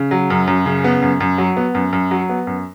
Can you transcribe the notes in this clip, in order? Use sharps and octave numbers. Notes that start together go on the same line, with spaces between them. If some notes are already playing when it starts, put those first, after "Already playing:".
Already playing: C#3
F#3
F#2
F#2
C#3
B3
F#2
F#2
F#3
B3
F#2
F#2
F#3
B3
F#2